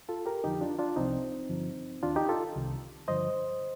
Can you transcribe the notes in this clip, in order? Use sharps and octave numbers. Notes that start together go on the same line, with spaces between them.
F4 A4
G4 A#4
F2 D3 F3 D#4 G4
D4 F4
D4 F4
C2 C3 F3 C4 D#4
G2 D3 F3
D#2 D#3 D4 F4
D#4 G4
F4 A4
C2 C3 D#3
G2 D3 F3 C5 D#5